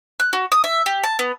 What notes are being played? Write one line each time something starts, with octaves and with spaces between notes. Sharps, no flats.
F#6
F#4
D#6
E5
G4
A5
B3